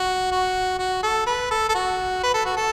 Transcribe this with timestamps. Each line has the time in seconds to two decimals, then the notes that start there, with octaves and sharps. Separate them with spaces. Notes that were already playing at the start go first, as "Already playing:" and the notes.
Already playing: F#4
0.31 F#4
0.79 F#4
1.03 A4
1.26 B4
1.50 A4
1.69 A4
1.74 F#4
2.23 B4
2.34 A4
2.45 F#4
2.57 A4